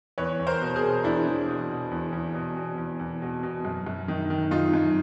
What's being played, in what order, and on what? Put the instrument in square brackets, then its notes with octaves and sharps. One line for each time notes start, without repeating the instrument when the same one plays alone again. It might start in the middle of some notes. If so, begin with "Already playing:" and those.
[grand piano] E2 B4 C#5
E2
A#4 C5
B2
G#4 A#4
B2
E2 D4 E4
E2
B2
B2
E2
E2
B2
B2
E2
E2
B2
B2
F#2
F#2
D#3
D#3
F#2 D#4 F4
F#2